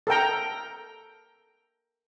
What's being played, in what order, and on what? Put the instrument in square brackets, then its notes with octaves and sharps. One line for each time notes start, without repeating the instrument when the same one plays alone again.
[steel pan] A4 A#4 G5 A#5